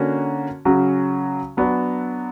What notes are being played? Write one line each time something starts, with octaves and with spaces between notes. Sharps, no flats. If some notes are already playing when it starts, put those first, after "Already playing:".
Already playing: D3 A#3 C#4 F#4
C#3 F#3 C#4 F#4
F#3 B3 D4 F#4